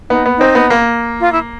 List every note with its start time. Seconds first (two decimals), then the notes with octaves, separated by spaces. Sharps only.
0.09 B3 D#4
0.26 B3
0.37 C4 D#4
0.55 B3
0.70 A#3
1.21 F4
1.32 E4